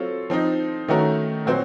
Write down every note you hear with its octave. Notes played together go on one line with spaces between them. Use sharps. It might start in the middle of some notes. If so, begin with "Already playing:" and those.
Already playing: F#3 C4 F4 A4 C#5
F3 C4 D#4
D#3 A3 C#4 F#4 A#4
A#2 F#3 C4 F#4 C5